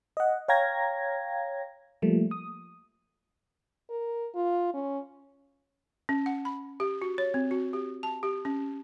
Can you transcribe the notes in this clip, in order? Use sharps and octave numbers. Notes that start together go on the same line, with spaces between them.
D#5 F#5
C#5 F5 G5 A#5 G#6 A#6
F3 G3 A3 A#3
D#6
A#4
F4
C#4
C#4
F#5
B5
G4
F#4
C#5
C4
F#4
G4
A5
G4
C#4